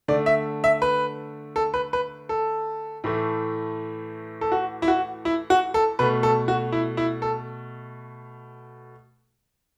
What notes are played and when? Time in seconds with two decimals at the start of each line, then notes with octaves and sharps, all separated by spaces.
0.08 D3 A3 D5
0.26 E5
0.64 E5
0.82 B4
1.56 A4
1.74 B4
1.93 B4
2.29 A4
3.04 A2 E3 A3
4.41 A4
4.52 F#4
4.82 E4
4.88 F#4
5.25 E4
5.50 F#4
5.74 A4
5.99 B2 A3 B4
6.23 A4
6.48 F#4
6.72 E4
6.97 E4
7.22 A4